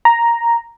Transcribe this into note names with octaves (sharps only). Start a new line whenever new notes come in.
A#5